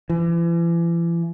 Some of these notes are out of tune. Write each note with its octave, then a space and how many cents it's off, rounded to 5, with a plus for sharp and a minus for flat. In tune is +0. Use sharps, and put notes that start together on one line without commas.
E3 +40